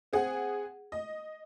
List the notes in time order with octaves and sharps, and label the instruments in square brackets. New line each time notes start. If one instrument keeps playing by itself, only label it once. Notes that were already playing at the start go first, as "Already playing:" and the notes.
[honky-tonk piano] C4 G#4 F#5
D#5